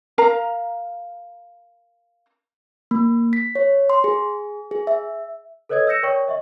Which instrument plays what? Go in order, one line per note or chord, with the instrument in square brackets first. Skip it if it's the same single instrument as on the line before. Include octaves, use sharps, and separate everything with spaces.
[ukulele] A#4 F5 A#5
[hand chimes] A#3
B6
C#5
C6
G#4
G#4
E5
[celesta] A4 B4 C#5 D#5 D#6 G#6
E6 G6 A#6 C#7 E7
A#4 C#5 D5 G5 C#6
D#5 E5 C#6